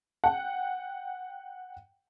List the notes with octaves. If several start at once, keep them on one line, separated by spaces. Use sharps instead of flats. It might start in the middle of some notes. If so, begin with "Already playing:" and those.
F#5 G5